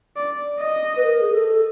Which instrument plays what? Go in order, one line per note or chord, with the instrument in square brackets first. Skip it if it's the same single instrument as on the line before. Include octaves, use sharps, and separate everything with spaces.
[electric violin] D5
D#5
[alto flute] B4
A#4
G#4
A4